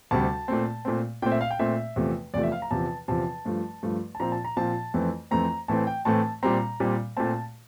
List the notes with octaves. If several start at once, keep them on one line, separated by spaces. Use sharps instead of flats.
D2 C3 G3 A5
A#2 A3 C4
A#2 A3 C4
A#2 A3 C4 G5
E5
F5
G5
A#2 A3 C4 E5
E2 C3 F3 A3
E2 C3 F3 A3 D5
E5
F5
A#5
E2 C3 F3 A5
E2 C3 F3 A5
G2 F3 A3
G2 F3 A3
A5
A#2 F3 C4 A#5
A5
A#5
A#2 F3 C4 A5
F2 E3 A3 C4
F2 E3 A3 C4 A#5
A2 E3 A3 C4 A5
G5
A2 E3 A3 C4 A5
A#2 G3 C4 A#5
A#2 G3 C4
A#2 A3 C4 A5